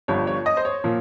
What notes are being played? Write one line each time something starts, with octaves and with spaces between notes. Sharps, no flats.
G1 G2 F3 C#5
C#5
D#5
C5
C#5
A#2 F3